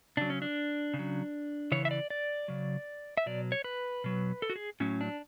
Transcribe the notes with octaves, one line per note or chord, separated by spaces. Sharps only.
C#3 F#3 D4
C#4
D4
C#3
F#3
C#3 E3 C#5
E5
D5
D5
C#3 F#3
E5
B2 F#3 D5
C#5
B4
B2 F#3
A4
F#4
G#4
A2 F#3 C#4
D4